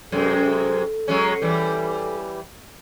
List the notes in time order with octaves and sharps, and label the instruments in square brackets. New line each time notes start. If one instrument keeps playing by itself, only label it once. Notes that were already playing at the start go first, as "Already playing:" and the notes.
[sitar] F#2 C3 G#3 [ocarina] A4
[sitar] F#3 G#3 C#4
E3 G3